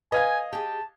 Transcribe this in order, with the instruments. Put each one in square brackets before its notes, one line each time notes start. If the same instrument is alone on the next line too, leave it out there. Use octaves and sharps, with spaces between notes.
[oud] B4 [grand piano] D#5 F5 G#6 [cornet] G#5
[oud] G4 G#4 [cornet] A5